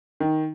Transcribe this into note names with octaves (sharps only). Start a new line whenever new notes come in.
D#3